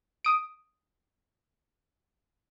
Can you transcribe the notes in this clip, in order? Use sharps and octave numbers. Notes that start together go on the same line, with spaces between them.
D#6 D7